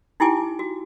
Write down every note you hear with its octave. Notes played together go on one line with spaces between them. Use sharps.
D#4 E4 G4 G5 G#5 D6
F#4